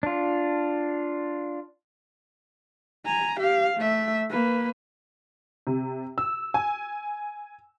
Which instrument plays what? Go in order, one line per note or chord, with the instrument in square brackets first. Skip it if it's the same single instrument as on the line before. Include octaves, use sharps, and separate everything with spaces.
[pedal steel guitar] D4 F4
[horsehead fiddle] G#5 A#5
G4 F5
A3 E5
A#3 B4
[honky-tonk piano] C3
E6
G#5